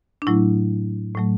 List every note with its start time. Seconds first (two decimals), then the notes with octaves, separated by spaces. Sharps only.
0.22 D4
0.27 A2 F#3 A3 E4
1.15 A2 F#3 A3